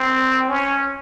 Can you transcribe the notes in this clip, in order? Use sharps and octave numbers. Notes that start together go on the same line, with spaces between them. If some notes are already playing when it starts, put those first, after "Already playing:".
Already playing: C4
C#4